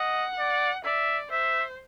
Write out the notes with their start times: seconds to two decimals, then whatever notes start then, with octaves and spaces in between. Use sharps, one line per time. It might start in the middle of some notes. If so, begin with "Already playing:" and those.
Already playing: D#5 F#5
0.39 D5
0.85 D5 E5
1.31 C5 E5